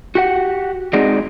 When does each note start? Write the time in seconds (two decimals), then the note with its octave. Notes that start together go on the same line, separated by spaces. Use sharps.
0.15 F#4 G4 F#5
0.93 G#3 C4 D#4 F#4 G#4 D5